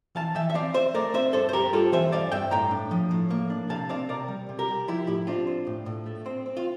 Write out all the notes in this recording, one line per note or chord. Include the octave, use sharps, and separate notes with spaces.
E3 F5 A5
E3 E5 G5
E5
C4 D5 F5
C4 C5 E5
A3 A#4 D5
C4 C5 E5
G2 A4 C5
C5
G3 G4 A#4
G2 F4 A4
E3 C5 E5
G2 D5 F5
G2 E5 G5
A2 G5 A#5
D4
F3
A2
A#3
D4
C3 F5 A5
C4 D5 F5
C3 A#4 D5
G3
C3
G4 A#4
G3
F3 E4 G4
A2 E4 G4
C4 D4 F4
C4
A2
A2
A3
C4
C4
F4